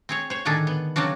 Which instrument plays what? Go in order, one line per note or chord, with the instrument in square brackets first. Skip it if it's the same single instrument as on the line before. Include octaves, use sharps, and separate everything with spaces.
[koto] C4 G#4 C#5
C5 C#5
A2 D3 D#3 D4 G#4 A4
B3
C#3 F#3 C4 D4 F#4